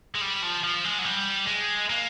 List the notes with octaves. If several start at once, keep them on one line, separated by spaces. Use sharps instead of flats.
G#3
G3
F3
F3
G#3
F#3
G3
G#3
A#3